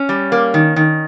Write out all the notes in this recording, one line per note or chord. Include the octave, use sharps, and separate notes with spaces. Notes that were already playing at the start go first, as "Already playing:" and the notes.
Already playing: C#4
G3
A#3
D#3
D#3